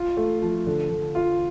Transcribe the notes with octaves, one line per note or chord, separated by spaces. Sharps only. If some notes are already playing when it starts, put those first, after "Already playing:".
Already playing: F4
A3
F3
D3
D3
F4